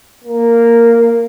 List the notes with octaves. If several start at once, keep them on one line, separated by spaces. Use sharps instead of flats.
A#3